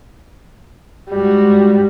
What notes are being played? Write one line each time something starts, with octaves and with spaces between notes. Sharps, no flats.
G#2 G3 F#4